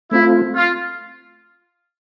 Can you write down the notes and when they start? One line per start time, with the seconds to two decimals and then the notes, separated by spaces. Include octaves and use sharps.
0.11 A3 C4 E4 F4
0.55 F4